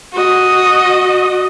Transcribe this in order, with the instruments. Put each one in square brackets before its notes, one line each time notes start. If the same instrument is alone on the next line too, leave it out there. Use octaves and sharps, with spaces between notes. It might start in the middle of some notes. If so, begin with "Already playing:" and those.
[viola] F#4 D#5